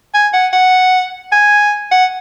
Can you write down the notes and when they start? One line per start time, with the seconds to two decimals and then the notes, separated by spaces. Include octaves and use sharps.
0.14 G#5
0.33 F#5
0.53 F#5
1.32 G#5
1.92 F#5